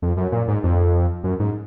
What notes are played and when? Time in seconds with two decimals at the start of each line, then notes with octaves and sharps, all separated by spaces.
0.02 F2
0.17 F#2
0.32 A#2
0.48 G#2
0.64 F2
1.24 F#2
1.39 G#2